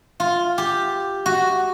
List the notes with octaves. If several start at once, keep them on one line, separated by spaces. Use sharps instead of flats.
F4
G4
F#4